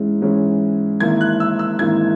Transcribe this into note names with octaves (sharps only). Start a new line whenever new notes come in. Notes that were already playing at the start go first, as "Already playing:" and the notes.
Already playing: G#2 E3 G#3 C#4 E4
G#2 E3 G#3 C#4 E4
G#1 G#2 E3 A#3 E4 G#6
F#6
E6
E6
G#1 G#2 E3 A#3 E4 G#6